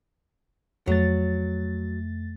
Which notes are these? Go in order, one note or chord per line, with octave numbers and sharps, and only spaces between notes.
F2 F#3 A3 A6